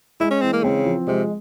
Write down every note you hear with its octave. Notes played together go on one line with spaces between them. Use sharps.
G#3 E4
C#4
E3 C4
A#3
C#3 C4
F3
C3 G#3